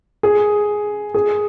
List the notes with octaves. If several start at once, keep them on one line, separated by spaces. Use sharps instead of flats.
G#4
G#4